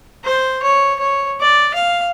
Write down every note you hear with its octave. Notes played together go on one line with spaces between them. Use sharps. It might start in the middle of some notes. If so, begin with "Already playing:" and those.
C5
C#5
C#5
D5
F5